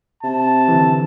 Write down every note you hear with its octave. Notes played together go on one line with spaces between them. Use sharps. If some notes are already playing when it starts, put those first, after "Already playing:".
C3 A5
D3 E3